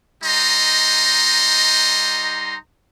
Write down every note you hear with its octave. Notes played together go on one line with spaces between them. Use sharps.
G3 D#4 D#5 A#5 C6